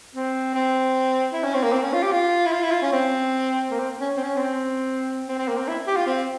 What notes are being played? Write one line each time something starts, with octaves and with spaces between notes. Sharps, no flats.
C4
C4
E4
C#4
C4
A#3
C4
C#4
F4
G4
F4
E4
F4
E4
F4
C#4
C4
A#3
C4
C#4
C4
C#4
C4
C4
C4
A#3
C4
E4
G4
F4
C4